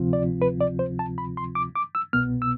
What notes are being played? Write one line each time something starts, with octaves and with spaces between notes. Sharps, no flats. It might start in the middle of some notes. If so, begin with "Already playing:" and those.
Already playing: D2 C3 F3 C4 F4
D5
B4
D5
C5
A5
B5
C6
D6
D6
E6
C2 B2 B3 F6
E6